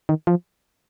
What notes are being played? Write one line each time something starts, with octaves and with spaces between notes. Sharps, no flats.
D#3
F3